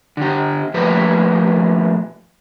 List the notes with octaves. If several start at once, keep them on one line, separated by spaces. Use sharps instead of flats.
D3 G4
A#2 F3 G3 A3 B4